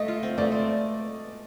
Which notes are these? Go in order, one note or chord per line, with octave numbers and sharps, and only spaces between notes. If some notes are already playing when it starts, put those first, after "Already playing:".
Already playing: A3 D#5
F4
C4
A3 D5
C4